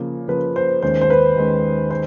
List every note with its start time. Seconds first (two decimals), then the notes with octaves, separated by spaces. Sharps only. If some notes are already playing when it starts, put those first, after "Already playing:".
Already playing: C#3 F3 A#3
0.28 C#3 F3 A#3 B4
0.56 C5
0.82 D#2 D#3 G#3 C#4 C5
1.01 C5
1.10 B4
1.36 D#2 D#3 G#3 C#4
1.91 C5